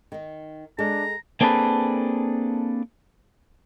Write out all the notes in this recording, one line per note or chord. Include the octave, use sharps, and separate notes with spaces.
D#3 D#4
G#3 D4 A4 A#5
A#3 C4 D4 G#4 A4 B4